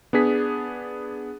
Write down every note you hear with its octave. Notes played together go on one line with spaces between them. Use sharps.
B3 D4 G#4 B6